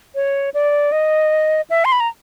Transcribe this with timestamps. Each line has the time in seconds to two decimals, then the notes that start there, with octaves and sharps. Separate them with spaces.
0.15 C#5
0.54 D5
0.92 D#5
1.70 E5
1.85 C6
1.92 B5
2.00 A#5